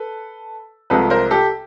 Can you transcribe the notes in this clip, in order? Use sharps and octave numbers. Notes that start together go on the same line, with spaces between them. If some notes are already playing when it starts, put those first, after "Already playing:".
Already playing: A4 B4
C2 C3 F3 G#3 A4 B4
A#4 C5
G4 A4